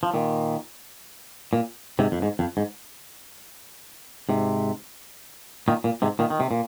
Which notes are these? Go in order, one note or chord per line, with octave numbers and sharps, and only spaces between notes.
F3
A#2 D#3
A#2
G#2 C3
F2
G#2
F2
G#2
G#2 C3
A#2 D#3
A#2
G#2 C3
A#2 D#3
D#3
C3
A#2